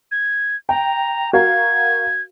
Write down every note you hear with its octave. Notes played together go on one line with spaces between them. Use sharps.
G#6
G5 A#5
F#4 A#4 F5 G#6